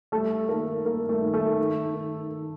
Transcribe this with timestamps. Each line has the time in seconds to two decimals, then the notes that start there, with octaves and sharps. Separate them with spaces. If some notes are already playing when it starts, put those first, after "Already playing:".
0.12 G3 A3 A4
0.49 D#3 A#3 A#4
0.86 A#3 A#4
1.09 A3 A4
1.22 D#3
1.34 A3 A4
1.58 D#3
1.95 D#3
2.31 D#3